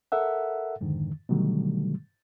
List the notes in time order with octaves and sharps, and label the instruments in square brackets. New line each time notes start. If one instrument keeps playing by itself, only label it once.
[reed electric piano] A4 A#4 E5 F#5
F2 G#2 D3 D#3
B2 D3 D#3 F#3 G3 A3